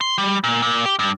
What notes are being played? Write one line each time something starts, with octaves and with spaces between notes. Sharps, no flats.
C6
G3
A#2
A#2
G4
G2